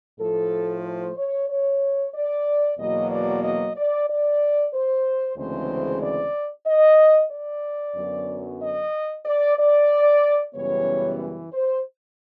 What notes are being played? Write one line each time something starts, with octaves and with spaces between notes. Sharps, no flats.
A2 F3 A3 A4
C5
C#5
C#5
D5
E2 B2 F#3 A#3 D#5
D5
D#5
D5
D5
C5
D2 C#3 E3 G#3 C4 C5
D5
D#5
D5
F#2 D3 F#3 B3
D#5
D5
D5
F#2 C#3 E3 G3 B3 C#5
C5